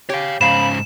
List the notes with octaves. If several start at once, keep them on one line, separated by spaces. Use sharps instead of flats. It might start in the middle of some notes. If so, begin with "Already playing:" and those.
G4 C#5 F5
G#2 C#3 C5 F5 B5 E7